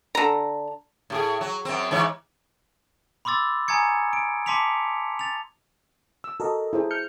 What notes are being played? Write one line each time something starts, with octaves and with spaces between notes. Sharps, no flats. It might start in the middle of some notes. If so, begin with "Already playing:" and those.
D3 A#5
A2 G4 G#4
F#3
F#2 C4
G#2 E3 C#5
B5 C6 D6 E6 A6
G#5 A#5 D#6 G#6 C#7
D7
A5 C6 D6 B6 C#7 F7
A6 F7
E6
F#4 A4 A#4 D#5
E4 G#4 C5
F6 G6 C#7